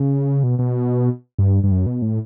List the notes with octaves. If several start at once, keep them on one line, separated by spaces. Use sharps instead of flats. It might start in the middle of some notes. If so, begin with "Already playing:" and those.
Already playing: C#3
B2
B2
G2
G2
F#2
B2
A2